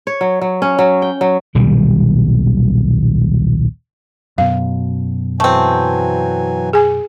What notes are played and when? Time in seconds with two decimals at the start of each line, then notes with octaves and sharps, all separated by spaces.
0.07 C#5
0.21 F#3
0.41 F#3
0.62 C#4
0.79 F#3
1.02 G5
1.21 F#3
1.55 D#1 B1 D#3 G3
4.38 F#2 B2 F5
5.40 E3 F#3 A3 C4 G#5
6.73 G#4 G#5